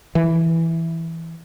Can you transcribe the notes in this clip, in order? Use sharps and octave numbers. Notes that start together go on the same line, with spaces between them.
E3